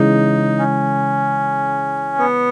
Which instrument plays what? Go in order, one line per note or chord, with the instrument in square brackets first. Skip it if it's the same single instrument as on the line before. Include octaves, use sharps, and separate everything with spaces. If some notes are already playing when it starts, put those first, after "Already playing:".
Already playing: [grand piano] C#3 E3 G#3 [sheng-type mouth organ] D#4
[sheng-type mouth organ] C#4
B3